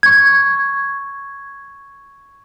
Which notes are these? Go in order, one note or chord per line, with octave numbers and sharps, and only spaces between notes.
C#6 G#6